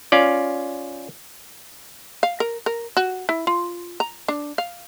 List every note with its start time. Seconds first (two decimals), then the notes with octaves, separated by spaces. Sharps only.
0.12 C#4 F4 D5
2.23 F5
2.40 A#4
2.66 A#4
2.97 F#4
3.29 E4
3.47 F4
4.00 A#5
4.28 D4
4.58 F5